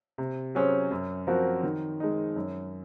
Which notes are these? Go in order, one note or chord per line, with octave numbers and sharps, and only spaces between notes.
C3
F#3 C#4 G#4 C5
F#2
F3 C4 F#4 A#4
D#3
G#3 D#4
F#2